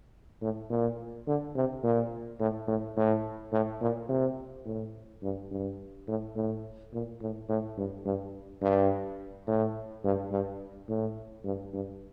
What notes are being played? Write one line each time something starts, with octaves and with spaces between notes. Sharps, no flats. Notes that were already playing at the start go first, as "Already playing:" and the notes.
A2
A#2
D3
C3
A#2
A2
A2
A2
A2
A#2
C3
A2
G2
G2
A2
A2
A#2
A2
A2
G2
G2
G2
A2
G2
G2
A2
G2
G2